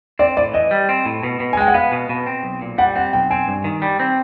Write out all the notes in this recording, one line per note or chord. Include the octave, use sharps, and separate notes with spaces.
C4 D5
A2 D5
E3 D#5
G3
C4
A2
B2
B2
G#5
G#3 G5
F#5
B3 F5
B2
B2
C4
B1
A#2
G3 F#5
C4 F#5
B1 G5
C4 G#5
G2
D#3
G3
C4